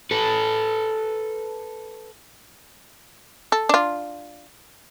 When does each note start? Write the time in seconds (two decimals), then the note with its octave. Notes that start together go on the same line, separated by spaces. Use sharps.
0.11 A4 B4
3.52 A4
3.69 D4 F4